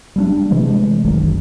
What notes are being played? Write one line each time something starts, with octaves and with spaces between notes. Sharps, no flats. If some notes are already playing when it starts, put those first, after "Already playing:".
G3 A3 D4
C3 E3 G#3 A3
F#1 B1 D#3